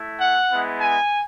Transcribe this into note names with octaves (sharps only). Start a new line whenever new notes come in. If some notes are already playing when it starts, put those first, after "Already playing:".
Already playing: A3 E4
F#5
G#3 B3 E4
G#5